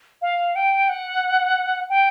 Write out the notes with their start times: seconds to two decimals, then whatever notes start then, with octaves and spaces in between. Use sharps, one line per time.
0.22 F5
0.55 G5
0.89 F#5
1.90 G5